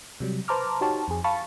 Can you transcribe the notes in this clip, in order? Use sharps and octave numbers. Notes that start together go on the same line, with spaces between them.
C3 F#3 G3
B4 C5 A5 A#5 D6 F6
D#4 F#4 G4 C#5 A5
F2 G#4
F5 A5 B5 C#6 A6